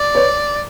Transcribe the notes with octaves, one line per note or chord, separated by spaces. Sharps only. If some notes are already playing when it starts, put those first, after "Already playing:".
Already playing: D5
B4 C#5